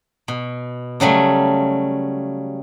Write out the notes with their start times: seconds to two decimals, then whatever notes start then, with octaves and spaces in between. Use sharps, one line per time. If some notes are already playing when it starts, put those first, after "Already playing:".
0.28 B2
1.00 C#3 F#3 G3 A3